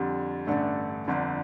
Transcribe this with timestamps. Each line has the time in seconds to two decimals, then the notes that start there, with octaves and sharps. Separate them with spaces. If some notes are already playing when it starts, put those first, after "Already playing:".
Already playing: F2 D3 G3
0.47 A1 G2 D3 A3
1.08 G1 F2 D3